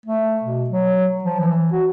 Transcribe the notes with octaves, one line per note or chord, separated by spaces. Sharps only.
A3
B2
F#3
F3
E3
F#4